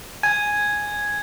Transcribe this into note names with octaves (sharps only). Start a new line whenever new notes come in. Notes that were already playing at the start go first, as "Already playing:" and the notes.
G#5 G#6